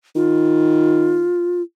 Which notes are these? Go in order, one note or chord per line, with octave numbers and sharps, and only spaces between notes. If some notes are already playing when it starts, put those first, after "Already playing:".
D#3 F4